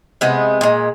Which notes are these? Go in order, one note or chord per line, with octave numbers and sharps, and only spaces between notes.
C3 G#3 B3
A#2 G#3